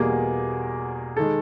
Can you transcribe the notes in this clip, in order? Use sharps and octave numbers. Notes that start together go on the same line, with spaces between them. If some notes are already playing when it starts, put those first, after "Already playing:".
Already playing: E2 B2 G3 A#3 G#4
D#3 G#3 A4